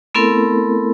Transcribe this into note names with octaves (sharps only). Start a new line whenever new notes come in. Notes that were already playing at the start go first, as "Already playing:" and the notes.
A3 B3 C4 E4 A4 A#4